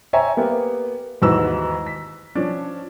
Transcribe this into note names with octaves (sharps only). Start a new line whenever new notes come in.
C5 C#5 E5 G5 G#5 A#5
A#3 B3 G4
D#2 G#2 E3 F#4 B4 E6
B6
F3 C#4 D4